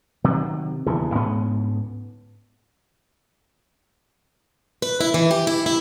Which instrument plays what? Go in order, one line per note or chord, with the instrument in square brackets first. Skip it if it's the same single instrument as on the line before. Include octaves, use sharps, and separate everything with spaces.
[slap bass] C3 D#3 F#3
D#1 E2 G2 C#3
D2 G#2 B3 C#4
[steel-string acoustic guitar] B4
E4
E3
G4
E4
E4